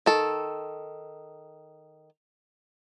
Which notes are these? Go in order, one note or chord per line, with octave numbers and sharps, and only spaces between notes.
D#3 A4